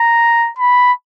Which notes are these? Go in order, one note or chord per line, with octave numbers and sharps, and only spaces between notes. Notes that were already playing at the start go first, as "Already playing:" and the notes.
Already playing: A#5
B5